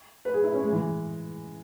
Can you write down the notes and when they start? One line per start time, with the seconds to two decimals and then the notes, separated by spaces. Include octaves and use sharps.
0.25 B4
0.34 G#4
0.44 E4
0.54 C#4
0.63 G#3
0.72 E3